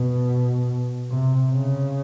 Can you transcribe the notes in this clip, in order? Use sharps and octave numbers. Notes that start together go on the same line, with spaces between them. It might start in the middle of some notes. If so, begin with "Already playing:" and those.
Already playing: B2
C3
C#3